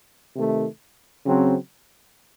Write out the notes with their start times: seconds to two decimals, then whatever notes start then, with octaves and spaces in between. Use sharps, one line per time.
0.35 C3 D#3 A3
1.25 C#3 F#3 C4